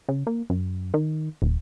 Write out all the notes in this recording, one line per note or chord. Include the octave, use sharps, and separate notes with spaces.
C#3
A#3
F#2
D#3
D#1